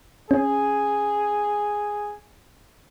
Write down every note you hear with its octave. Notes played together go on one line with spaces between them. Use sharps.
C#4 G#4